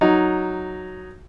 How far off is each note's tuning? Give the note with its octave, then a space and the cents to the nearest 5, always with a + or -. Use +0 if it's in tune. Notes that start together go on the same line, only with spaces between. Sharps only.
F#3 +0 D#4 +0